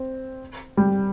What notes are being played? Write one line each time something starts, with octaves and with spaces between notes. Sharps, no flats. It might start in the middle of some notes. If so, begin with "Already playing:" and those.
Already playing: C4
G3